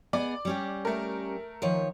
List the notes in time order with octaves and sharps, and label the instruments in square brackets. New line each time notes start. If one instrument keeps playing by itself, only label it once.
[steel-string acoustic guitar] B3 G#4 D#5 [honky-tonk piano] D5
[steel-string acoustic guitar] G3 C#4 G4
[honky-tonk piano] A3 A#4
[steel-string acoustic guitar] D#3 F3 C#5